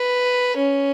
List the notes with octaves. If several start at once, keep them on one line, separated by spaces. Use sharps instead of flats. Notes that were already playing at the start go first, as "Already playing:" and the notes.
Already playing: B4
C#4